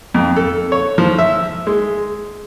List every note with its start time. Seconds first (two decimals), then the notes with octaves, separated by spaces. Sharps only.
0.14 F2
0.36 A4
0.72 C#5
0.98 F3
1.18 E5
1.67 G#3